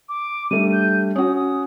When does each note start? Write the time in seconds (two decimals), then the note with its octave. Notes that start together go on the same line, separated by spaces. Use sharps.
0.09 D6
0.51 G3 A3 D4 D#7
0.72 G6
1.16 C#4 F#4 D#6
1.36 D#6